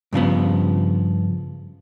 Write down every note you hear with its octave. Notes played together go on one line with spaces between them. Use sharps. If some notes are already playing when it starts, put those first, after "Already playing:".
G2 C#3 F3 B3